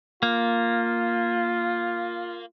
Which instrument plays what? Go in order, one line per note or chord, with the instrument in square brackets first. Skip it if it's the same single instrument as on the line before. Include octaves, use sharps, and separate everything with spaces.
[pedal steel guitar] A#3 [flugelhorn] F4